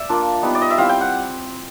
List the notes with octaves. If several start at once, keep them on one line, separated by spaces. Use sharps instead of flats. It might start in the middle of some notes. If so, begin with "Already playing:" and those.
Already playing: D5 E5
A#3 D4 F4
G3 B3 D#4
D5
D#5
E5
G3 C4 E4 F5
G5
F#5